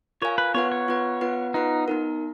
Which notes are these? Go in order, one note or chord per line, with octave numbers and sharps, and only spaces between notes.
F4 A#4 C#5 F5 G#5
B4
B3 F4 B4 C#5 F#5
C#5
B3 F4 B4 F#5
B3 F4 B4 F#5
B3 D#4 F4 B4 F#5
B3 D#4 A#4